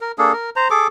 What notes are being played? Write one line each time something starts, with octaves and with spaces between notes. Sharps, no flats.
A#4
A#3 D4 G#4 A4
A#4
C5 A#5
G#4 A4 D6